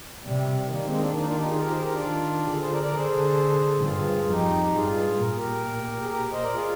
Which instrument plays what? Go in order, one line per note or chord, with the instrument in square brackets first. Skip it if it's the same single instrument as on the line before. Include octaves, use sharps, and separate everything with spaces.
[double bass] C3 [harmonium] G3
[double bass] D#3 [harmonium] G3 A#3
[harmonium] G#3 C4
A#3 D4
A#3 D4
D#4
D4 F4
D#4 G4
F4 G#4
G4 A#4
G#4 C5
G4 A#4
D4 F4
[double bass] D#3
[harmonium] G4
[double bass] D3 [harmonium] F4 G#4
[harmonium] G#4 C5
A#4 D5
A#4 D5
[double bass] D3 [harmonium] G#4 C5
[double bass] G2 [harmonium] F4 G#4
[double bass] F2 [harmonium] D#4 G4
[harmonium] G4
[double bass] G2 [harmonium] F4 G#4
[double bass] A#2 [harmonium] A#4
[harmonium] G#4
G4 A#4
G#4
G4 A#4
C5 D#5
A#4 D5
F4 G#4